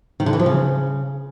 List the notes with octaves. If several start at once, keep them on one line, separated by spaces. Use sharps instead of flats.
D#3
D3
E3
F3
C#3